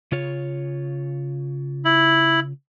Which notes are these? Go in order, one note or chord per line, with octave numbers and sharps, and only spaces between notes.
C#3 F4 C#5
E4